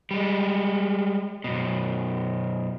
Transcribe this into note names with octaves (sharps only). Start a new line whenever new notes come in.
G3 G#3
F#2 B2